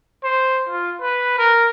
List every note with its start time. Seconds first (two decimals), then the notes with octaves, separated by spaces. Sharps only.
0.24 C5
0.69 F4
1.01 B4
1.38 A#4